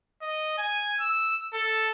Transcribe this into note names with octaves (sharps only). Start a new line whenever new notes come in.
D#5
G#5
E6
A4